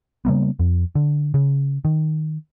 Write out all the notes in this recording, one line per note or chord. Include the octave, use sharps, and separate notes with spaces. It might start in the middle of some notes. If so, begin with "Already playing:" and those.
C#3 G3 A#3 B3
F2
D3
C#3
D#3